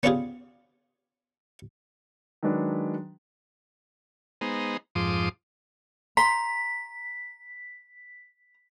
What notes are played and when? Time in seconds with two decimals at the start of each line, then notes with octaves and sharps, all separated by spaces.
0.03 B3 C#4 D4 F4 G4 G#4
2.43 D#3 F#3 G#3 D4 B4
4.41 G#3 B3 D#4 C5 A#5
4.95 F2 G#2 F3 C6 D6 D#6
6.17 A#5 C6 B6